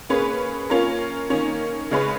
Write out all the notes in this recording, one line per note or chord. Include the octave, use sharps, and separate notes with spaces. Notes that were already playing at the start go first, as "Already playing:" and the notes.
A#3 C#4 G#4 B4
A#3 C#4 F4 A#4
D#3 A#3 C#4
C#3 G#3 C#4 G#4 B4